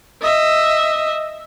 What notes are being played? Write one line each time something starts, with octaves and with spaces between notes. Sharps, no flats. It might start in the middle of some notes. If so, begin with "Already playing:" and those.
D#5 E5